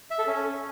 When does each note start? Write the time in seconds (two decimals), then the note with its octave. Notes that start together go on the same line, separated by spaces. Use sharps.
0.11 E5
0.19 A4
0.27 C#4